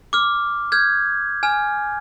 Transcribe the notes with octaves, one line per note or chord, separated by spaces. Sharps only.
D6 F6
F6 G6 G#6
G#5 F6